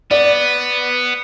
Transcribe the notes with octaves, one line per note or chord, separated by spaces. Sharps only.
B3 D5